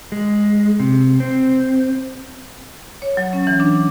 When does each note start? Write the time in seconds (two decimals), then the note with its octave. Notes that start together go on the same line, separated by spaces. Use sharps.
0.12 G#3
0.80 C3
1.20 C4
3.02 C#5
3.17 F#3
3.33 C#4
3.47 E3
3.60 D4